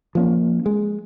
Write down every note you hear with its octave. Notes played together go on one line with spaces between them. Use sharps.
F3 A#3 C#4
G#3